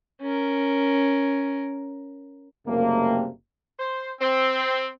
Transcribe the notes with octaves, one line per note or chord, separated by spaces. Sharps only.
C#4 A#4
F#1 C3 G3 A3 A#3
C5
C4